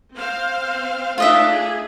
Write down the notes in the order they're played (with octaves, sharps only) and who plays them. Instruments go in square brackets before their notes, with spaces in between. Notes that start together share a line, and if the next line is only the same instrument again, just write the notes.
[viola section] C4 C5 F5
[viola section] A3 D4 D#4 [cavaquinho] F4 D#5 E5
[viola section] G#4